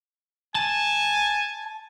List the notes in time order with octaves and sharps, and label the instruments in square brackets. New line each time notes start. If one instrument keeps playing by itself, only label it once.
[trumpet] G#5 [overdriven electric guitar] A5